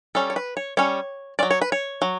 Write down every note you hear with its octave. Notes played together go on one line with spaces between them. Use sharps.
G3 C#4 A4
C#5
B4
C#5
G3 C#4 C#5
F#3 C#4 D5
C#5
B4
C#5
F#3